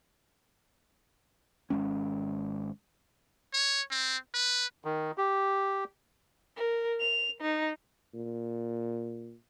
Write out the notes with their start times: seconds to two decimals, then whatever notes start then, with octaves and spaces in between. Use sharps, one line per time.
1.70 G#1 G2 G#3 C#4
3.53 C#5
3.91 C4
4.34 B4
4.85 D#3
5.18 G4
6.56 A#4
7.00 F7
7.41 D#4
8.14 A#2